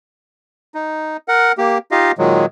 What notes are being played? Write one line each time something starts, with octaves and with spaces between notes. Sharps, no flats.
D#4
A#4 F#5
A#3 G4
D#4 F4 G4 D#5 F5
A#2 D#3 F#3 G#3